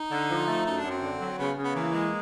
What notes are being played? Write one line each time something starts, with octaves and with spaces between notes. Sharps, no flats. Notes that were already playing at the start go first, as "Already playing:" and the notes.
Already playing: D#4
D3
F3
A3
F#2 D#4
D4
F#2
C4
D3
F#3
C#3 B3
C#3
B3
E3 A#3
G#3